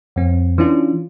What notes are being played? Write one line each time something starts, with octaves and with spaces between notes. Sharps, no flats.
F2 C4
E3 C#4 D4 F4